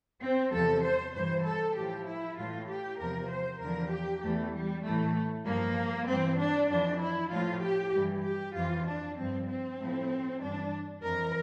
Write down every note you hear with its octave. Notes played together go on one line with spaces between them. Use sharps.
C4
E2 C3 F3 A4
C5
G2 E3 C5
A4
A2 F3 G4
E4
A2 E3 F4
G4
E2 C3 F3 A#4
C5
E2 D3 F3 A#4
G4
E2 E3 A3
G3
A2 E3 A3
G2 F3 A#3
G2 E3 C4
D4
F2 E3 D4
E4
A2 F3 F4
G4
G2 E3
G4
F2 E3 F4
D4
G2 F3 C4
C4
A2 F3
G2 E3 D4
F2 E3 A#4